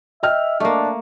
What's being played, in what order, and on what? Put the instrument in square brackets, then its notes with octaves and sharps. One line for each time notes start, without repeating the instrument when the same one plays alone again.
[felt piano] D#5 G5 F6 [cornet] E5
[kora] A3 A#3 [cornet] D4